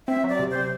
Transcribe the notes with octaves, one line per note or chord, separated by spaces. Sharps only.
C4 E5
F#3 D5
C3
C3 C5